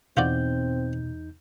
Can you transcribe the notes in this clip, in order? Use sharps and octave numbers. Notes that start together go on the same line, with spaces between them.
E2 B2 C4 D#4 F4 F#4 D5 G6